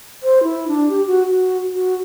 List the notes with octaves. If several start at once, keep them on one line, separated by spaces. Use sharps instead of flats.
C5
E4
D4
G4
F#4
F#4
F#4